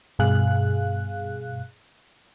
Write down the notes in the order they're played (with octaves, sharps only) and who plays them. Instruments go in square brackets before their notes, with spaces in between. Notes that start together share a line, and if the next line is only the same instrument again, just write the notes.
[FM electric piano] G2 B2 G#4 F5 F#6